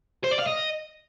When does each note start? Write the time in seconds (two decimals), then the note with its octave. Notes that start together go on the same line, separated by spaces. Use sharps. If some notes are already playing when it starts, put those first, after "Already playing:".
0.24 C5
0.32 D5
0.40 F5
0.47 D#5